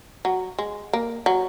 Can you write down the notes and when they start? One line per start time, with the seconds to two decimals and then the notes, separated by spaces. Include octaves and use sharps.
0.25 F#3
0.59 G#3
0.93 A#3
1.26 F#3